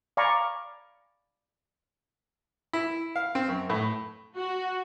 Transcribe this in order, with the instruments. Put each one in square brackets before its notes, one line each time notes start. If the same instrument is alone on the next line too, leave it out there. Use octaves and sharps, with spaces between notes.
[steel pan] D5 F5 G#5 A#5 B5 C#6
[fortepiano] E4
F5
C4
F#2
A2
[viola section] F#4